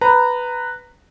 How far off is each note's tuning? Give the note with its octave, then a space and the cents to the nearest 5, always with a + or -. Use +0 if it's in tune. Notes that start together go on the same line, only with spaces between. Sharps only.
B4 +0 A#5 -15